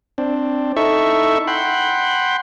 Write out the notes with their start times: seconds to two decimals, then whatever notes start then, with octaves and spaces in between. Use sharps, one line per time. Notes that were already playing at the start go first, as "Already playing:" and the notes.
0.18 C4 D4
0.76 D#4 E4 A4 E5 C#6
1.47 F#5 G5 B5 C6